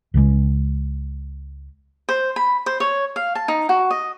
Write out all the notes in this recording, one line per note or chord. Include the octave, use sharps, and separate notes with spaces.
C#2 C#3 F3 G#3
C5
B5
C5
C#5
F5
A5
D#4
F#4
D#5